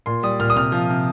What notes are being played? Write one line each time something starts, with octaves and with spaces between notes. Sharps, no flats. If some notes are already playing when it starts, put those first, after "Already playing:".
A#2 C6
G3 D#6
A#2 F6
D#6
C3 F6
F3
C3